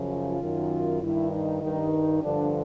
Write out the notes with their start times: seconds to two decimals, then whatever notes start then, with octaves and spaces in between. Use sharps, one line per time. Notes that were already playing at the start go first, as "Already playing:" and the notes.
Already playing: F#2 C#3 F3
0.10 F4
0.41 F#2 D#3
1.01 G2 D#3 E4
1.31 D#4
1.62 G2 D#3 D#4
2.22 G2 D3 F3 D4